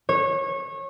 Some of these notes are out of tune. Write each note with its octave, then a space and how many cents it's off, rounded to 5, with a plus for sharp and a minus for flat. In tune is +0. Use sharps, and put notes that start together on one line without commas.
C#5 -25